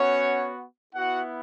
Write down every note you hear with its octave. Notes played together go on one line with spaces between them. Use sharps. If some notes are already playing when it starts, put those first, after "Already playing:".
Already playing: B3 C#4 F#4 C#5
B3 E4 F#4 F#5